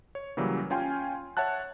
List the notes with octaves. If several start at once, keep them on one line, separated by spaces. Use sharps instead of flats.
C#5
C#3 E3 F#3 G3 A#3
C#4 F4 G5 G#5 C6
C#5 E5 F#5 A5 F#6